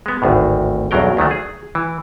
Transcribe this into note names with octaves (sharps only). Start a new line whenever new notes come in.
G#3 B3
G#1 D2 A2
B1 E2 G2 F#3 A#4 G5
D2 D#3 F#3 A3
G#4
E3